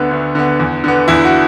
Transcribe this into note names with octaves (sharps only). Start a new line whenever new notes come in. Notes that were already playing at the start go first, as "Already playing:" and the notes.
Already playing: D2 D3 B3
D2
D3 B3
E2
D3 B3
E2 E4
F#4